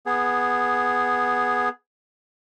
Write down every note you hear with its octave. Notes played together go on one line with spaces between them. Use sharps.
B3 G#4